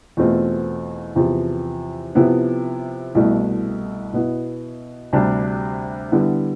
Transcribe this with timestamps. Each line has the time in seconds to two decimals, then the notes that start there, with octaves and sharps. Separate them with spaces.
0.17 E2 B2 A3 C4 F4
1.16 E2 C3 F3
2.15 C3 F3 B3 E4
3.15 C2 B2 A3 E4
4.13 B2 B3 E4
5.13 D2 C3 G3 D4
6.12 D3 G3 B3 E4